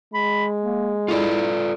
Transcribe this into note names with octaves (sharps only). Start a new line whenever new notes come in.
G#3 B5
A#3
E4 F4 A4 D5